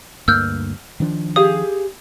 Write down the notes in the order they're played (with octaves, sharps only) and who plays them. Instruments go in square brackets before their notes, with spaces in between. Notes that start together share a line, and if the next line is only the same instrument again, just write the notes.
[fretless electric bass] D2 G2 A#3 [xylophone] E6 F6 G6
[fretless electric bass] D#3 F3 D4
[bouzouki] G4 G#4 F5 [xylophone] D#6